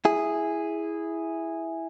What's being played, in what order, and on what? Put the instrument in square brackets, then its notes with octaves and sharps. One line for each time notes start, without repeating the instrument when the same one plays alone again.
[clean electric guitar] E4 G#4